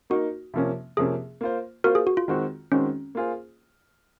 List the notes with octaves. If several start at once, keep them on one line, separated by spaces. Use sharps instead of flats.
A#3 D#4 F#4 A#4
C3 F3 A#3 C#4
C3 F3 A#3 C#4 G#4
A#3 F4 C5
A#3 F4 F#4 A#4 C5
G#4
F#4
F4
D#3 G#3 C4 F#4
D#3 G#3 C4 C#4 F#4
A#3 F4 G#4 C5